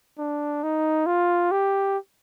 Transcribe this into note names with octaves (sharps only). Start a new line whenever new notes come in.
D4
D#4
F4
G4